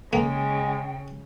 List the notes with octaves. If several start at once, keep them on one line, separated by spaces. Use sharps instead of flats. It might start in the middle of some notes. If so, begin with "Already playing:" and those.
C#3 G#3 A#3 G5